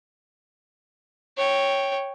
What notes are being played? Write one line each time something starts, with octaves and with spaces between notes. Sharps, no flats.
C#5 G5